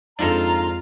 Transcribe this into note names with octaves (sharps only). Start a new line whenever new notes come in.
F2 G#2 D4 D#4 F4 A4 A#5